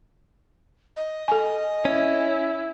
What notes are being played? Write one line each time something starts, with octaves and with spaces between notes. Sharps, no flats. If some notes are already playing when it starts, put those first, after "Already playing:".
D#5
A4 G#5
C#4 E4